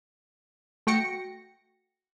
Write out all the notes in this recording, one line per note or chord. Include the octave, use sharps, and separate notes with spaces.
A3 F#4 G5 A#6 C#7